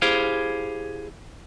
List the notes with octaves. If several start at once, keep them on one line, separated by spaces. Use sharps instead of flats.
E4 G4 G#4 C5 F5